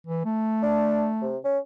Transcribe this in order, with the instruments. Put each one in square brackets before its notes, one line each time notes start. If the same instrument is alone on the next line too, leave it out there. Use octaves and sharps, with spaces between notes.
[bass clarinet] E3
A3
[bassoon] D4
C3
C#4